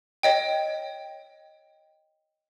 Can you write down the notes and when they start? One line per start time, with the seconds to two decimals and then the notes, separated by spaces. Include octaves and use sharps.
0.23 C#5 D#5 G5